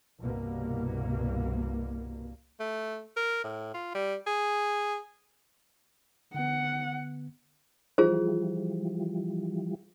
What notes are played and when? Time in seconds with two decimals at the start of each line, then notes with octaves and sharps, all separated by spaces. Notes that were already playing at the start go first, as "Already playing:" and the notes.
0.20 C2 G2 B2 A#3
2.60 A3
3.16 A#4
3.44 A2
3.74 F4
3.94 G3
4.27 G#4
6.34 D3 B3 F#5
7.98 E3 F3 G3 F4 G#4 C5